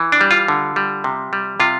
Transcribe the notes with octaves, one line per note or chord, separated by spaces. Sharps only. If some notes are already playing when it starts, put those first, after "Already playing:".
Already playing: E3
D4
G3
F4
D3
G3
C3
G3
C3 F4